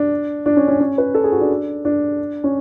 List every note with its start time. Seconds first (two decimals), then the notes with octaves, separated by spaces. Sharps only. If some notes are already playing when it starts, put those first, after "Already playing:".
Already playing: D4
0.46 D4
0.57 C#4
0.68 C#4
0.80 C#4
0.98 B4
1.14 A4
1.24 G#4
1.32 F#4
1.41 D4
1.85 D4
2.44 C#4